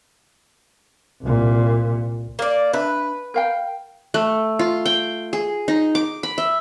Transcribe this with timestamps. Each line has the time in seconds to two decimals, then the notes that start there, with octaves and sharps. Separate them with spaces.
1.22 C2 A#2
2.39 A#3 D5
2.73 D4 B4 E5
3.34 A#4 F5 G5
4.14 A3
4.59 F4
4.85 G5
5.33 G#4
5.68 D#4
5.95 D6
6.23 B5
6.38 E5